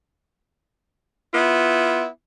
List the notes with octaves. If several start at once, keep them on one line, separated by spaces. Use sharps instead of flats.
B3 E4 F4